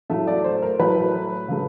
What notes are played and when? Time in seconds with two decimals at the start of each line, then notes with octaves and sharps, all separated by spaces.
0.10 A2 F#3 A3 E5
0.27 D5
0.44 C5
0.62 A#4
0.80 A2 F#3 A3 B4
1.48 C#3 F#3 A3